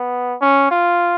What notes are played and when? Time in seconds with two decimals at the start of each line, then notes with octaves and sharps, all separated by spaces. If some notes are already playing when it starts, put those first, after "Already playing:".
Already playing: B3
0.41 C#4
0.71 F4